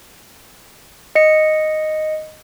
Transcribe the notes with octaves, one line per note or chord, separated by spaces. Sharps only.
D#5 C#7